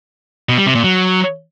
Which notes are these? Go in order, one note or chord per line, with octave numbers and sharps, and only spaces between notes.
B2
G3
C3
A#2
F#3